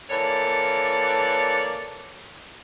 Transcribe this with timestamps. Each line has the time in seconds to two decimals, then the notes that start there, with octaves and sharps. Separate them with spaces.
0.10 E3 A#3 A4 C#5 D5